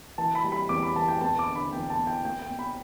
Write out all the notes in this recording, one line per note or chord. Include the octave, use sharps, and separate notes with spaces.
E3 A5
B5
G3
B5
E2 D6
B5
E3 A5
G5
E2 A5
D6
D3
B5
E2 G5
A5
B3
G5
B3 G5
G5
B3
B5